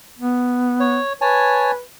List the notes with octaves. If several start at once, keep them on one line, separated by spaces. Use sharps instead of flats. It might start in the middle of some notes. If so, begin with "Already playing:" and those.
B3
C#5
B4 C#5 G#5 A5